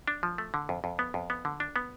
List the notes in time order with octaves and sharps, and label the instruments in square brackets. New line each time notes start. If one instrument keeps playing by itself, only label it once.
[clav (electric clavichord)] D4
F3
A3
D3
F2
F2
B3
F2
B3
D3
D4
B3